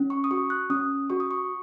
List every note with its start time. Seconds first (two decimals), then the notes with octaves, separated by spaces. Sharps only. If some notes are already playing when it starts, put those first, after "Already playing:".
Already playing: C#4
0.10 C#6
0.24 D#6
0.31 F#4 C#6
0.50 F#6
0.70 C#4 D#6
1.10 F#4 C#6
1.20 D#6
1.31 C#6